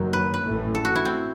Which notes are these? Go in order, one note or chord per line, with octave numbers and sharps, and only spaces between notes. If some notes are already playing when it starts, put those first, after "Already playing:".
Already playing: F#1 F#2 D#3 F#3
B4
B4
A1 A2 E3 A3
A4
F#4
E4
C4